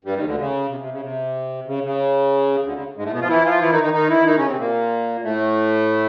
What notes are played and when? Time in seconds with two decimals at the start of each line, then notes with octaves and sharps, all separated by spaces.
0.04 G2 G3
0.16 D#2 D#3
0.26 D2 D3
0.37 C#3
0.69 C3
0.80 C3
0.91 C#3
1.02 C3
1.66 C#3
1.83 C#3
2.64 D2 D3
2.75 C#3
2.96 G#2 G#3
3.05 A2 A3
3.13 B2 B3
3.21 F3 F4
3.29 E3 E4
3.45 F3 F4
3.61 E3 E4
3.71 D#3 D#4
3.83 D#3 D#4
3.93 D#3 D#4
4.10 E3 E4
4.26 D#3 D#4
4.37 C#3 C#4
4.48 C3 C4
4.58 A#2 A#3
5.23 A2 A3